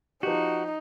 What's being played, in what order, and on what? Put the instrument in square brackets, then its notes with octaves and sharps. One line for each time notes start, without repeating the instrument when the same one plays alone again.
[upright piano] F3 G4 [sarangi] D#4 [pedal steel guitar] F#4